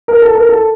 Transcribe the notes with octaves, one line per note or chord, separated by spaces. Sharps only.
A#4
A4
A#4
A4